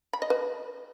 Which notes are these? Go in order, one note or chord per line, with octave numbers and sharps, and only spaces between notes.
B5
D#5
B4